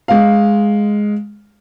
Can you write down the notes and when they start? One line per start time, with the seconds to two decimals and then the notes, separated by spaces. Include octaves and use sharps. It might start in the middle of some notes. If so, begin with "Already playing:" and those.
0.08 G#3 F5